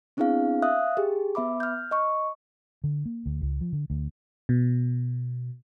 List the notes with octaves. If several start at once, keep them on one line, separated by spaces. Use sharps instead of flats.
B3 C4 D4 E4 G#4 F5
E5 F5 D#6 F#6
G4 G#4
B3 E5 B5 D6
F6 G6
D#5 C#6
D3
A#3
D2
C#2
F3
D3
D2
B2